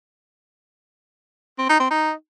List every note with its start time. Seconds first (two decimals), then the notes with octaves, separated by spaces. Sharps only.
1.58 C4
1.69 D#4
1.80 C4
1.91 D#4